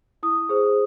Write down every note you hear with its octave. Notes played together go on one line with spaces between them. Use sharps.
E4 D#6
G#4 C5